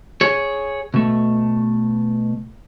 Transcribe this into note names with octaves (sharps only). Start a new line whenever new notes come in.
G#4 C#5
B2 A3